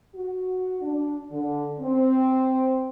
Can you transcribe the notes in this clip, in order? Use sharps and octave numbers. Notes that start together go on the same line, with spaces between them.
F#4
D4
D3
C4